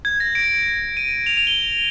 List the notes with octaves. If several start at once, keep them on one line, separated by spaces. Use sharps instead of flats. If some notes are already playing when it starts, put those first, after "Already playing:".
G#6
A#6
D7
D#7
F7
F7
G7